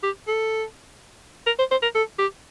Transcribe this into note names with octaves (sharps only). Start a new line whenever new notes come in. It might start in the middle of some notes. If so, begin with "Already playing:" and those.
G4
A4
A#4
C5
C5
A#4
A4
G4